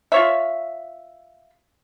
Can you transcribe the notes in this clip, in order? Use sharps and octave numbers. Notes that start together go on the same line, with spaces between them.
F4 C#5 E5